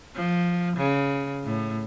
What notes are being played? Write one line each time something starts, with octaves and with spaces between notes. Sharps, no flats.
F3
C#3
A2